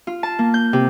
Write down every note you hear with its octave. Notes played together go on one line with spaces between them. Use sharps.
F4
A5
A#3
G6
C3